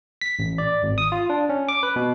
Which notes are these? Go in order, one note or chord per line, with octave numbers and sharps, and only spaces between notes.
B6
A1
D5
G#1
D#6
F4
D4
C#4
D6
B4
B2